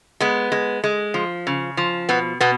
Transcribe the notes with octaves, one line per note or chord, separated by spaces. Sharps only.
G#3 B3
G#3
G#3
F3
C#3
F3
B2 B3
B2 B3